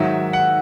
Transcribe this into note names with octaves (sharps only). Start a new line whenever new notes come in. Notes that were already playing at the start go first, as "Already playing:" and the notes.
Already playing: G#2 D#3 F#3 E5
F#5